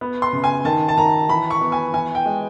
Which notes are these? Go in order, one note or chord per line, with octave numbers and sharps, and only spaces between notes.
B3
C6
C#3
G#5
D#3 A5
A5
D#3 A#5
E3 B5
C#6
B3
G#5
E3 G#5
G5
G#3